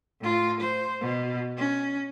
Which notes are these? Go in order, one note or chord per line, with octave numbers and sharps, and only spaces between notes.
A2 F4
C5
B2
C#4